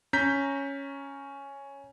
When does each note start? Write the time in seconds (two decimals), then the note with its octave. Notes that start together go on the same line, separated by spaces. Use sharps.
0.13 C#4 A#5 G6 B6